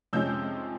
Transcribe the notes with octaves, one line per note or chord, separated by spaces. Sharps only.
F2 C3 F3 G#3 C#4 E6 G6